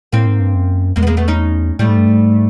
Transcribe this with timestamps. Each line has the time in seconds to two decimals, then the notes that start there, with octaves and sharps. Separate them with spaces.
0.13 A2 A#3 C4
0.27 G#2
0.40 G2
0.55 F#2
0.96 E2 G#3 A#3
1.03 B3
1.07 G#3 A#3
1.17 A3 B3
1.28 C#4 D#4
1.79 A2 G3 A3
1.88 G#2
1.98 G2
2.07 G#2